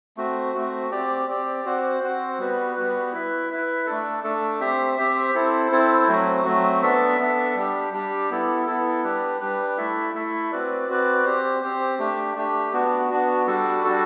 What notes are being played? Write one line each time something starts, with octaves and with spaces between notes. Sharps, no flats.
A3 C4 F#4
A3 C4 F#4
C4 G4 D5
C4 G4 D5
C4 F#4 C5 F#5
C4 F#4 C5 F#5
G3 B3 F#4 B4
G3 B3 F#4 B4
E4 B4 E5
E4 B4 E5
A3 D4 A4
A3 D4 A4
C4 G4 C5 E5
C4 G4 C5 E5
C4 E4 A4 C5
C4 E4 A4 C5
F#3 A3 C4 F#4
F#3 A3 C4 F#4
B3 D4 A4 E5
B3 D4 A4 E5
G3 D4 G4
G3 D4 G4
B3 E4 A4
B3 E4 A4
G3 D4 G4 B4
G3 D4 G4 B4
A3 E4 A4 E5
A3 E4 A4 E5
C4 F#4 B4 D5
C4 F#4 B4 D5
C4 G4 C5
C4 G4 C5
A3 D4 G4
A3 D4 G4
B3 D4 F#4
B3 D4 F#4
G3 D4 F#4 A4
G3 D4 F#4 A4